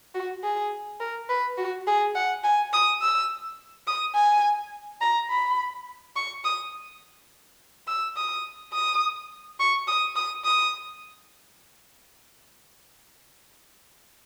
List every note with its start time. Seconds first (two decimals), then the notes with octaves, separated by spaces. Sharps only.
0.15 F#4
0.43 G#4
1.00 A#4
1.29 B4
1.58 F#4
1.87 G#4
2.15 F#5
2.44 G#5
2.73 D#6
3.02 E6
3.87 D#6
4.15 G#5
5.01 A#5
5.30 B5
6.16 C#6
6.44 D#6
7.88 E6
8.16 D#6
8.74 D#6
9.60 C#6
9.88 D#6
10.16 D#6
10.45 D#6